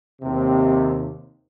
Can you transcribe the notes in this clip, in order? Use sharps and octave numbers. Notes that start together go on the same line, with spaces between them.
D#2 C3